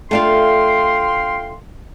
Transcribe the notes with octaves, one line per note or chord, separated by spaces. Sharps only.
A3 D4 F4 F5 G5 C6